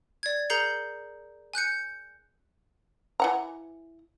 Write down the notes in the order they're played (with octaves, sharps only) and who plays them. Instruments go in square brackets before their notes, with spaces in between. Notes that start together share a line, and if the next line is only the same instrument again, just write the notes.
[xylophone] D5 G#6
G#4 A#4 A#5 G6 C7 C#7
G#5 F#6 G6 C#7
[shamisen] E3 F#5 A#5